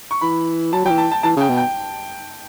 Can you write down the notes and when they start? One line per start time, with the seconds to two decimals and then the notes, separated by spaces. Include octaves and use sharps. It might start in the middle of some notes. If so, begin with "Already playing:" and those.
0.11 C#6
0.21 E3 B5
0.73 F#3 A5
0.85 F#3 G5
0.90 E3
0.98 A5
1.12 A5
1.23 E3 A5
1.36 C#3 G5
1.49 B2
1.57 G5